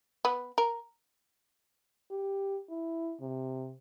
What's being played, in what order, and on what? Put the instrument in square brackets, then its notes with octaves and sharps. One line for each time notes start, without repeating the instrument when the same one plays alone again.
[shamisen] B3
A#4
[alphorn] G4
E4
C3